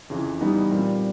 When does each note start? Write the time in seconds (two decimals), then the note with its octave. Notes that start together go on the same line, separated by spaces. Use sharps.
0.10 F2 C#3 E3
0.41 E3 G3 B3 D#4
0.71 A#2 G3 C4